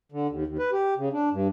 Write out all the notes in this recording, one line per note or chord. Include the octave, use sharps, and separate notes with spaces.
D3
D#2
D#2
B4
G4
C#3
D4
G2